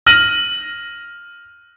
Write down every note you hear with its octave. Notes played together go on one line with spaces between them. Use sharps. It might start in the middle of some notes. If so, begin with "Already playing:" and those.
F6 A#6 D#7 F#7